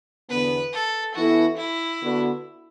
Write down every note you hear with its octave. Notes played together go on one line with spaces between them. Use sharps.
E2 D3 B3 B4
A4
E3 B3 E4 F#4 A4
E4
D3 B3 F#4